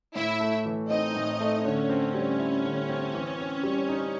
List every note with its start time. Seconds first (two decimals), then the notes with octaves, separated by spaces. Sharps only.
0.15 A2 E4 E5
0.40 A3
0.66 E3
0.90 C4 D#4 D#5
1.15 A2
1.40 A3
1.65 D3 C#4 C#5
1.90 C4
2.14 G3
2.39 E4
2.64 D3
2.89 C4
3.14 E3
3.39 C4
3.64 G3
3.89 D#4